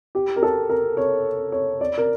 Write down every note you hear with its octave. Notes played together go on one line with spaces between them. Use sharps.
G4
A#4
A4
A#4
C#5
C#5
D5
A#4